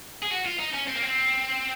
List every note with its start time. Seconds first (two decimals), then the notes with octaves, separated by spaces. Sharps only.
0.23 G#4
0.31 F#4
0.46 F4
0.60 D#4
0.75 C#4
0.88 C4
0.96 A#3
1.03 C4